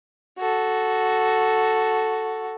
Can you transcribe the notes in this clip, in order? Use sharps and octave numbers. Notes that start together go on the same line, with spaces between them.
F#4 A4